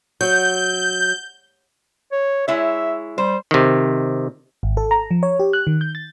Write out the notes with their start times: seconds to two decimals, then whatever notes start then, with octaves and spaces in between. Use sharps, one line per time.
0.21 F#3 G6
2.12 C#5
2.48 G#3 E4 C#5 E5
3.18 G3 C5
3.51 C3 D#3
4.63 G#1
4.77 A4
4.91 A#5
5.11 F3
5.23 C#5
5.39 G4
5.53 F#6
5.67 D#3
5.81 G6
5.95 A6